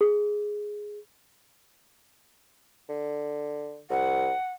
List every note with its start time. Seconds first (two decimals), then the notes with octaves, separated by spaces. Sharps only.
0.01 G#4
2.89 D3
3.90 C2 F#5